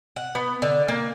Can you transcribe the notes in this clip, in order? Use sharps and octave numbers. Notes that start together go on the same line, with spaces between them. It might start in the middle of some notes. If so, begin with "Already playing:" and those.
F#5
B3
D3
A#3